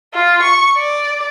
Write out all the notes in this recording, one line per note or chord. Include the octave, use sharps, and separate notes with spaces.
F4
C#6
D5